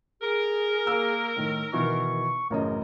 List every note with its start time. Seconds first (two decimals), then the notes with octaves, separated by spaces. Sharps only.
0.21 G#4 A#4
0.87 A#3 E6
1.36 A2 D#3
1.73 B2 D#3 E3 C#6
2.50 A1 F#2 C#3 A#4 D#5